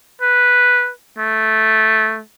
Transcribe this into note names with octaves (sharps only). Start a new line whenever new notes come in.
B4
A3